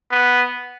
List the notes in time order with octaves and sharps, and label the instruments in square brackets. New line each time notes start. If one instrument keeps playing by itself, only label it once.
[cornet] B3